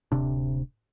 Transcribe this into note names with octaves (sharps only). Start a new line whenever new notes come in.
D1 D2 C3 D4